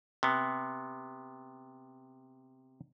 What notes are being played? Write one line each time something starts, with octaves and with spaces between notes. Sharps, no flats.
C3 B3